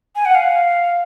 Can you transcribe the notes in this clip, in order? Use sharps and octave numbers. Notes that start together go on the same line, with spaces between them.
G#5
F#5
F5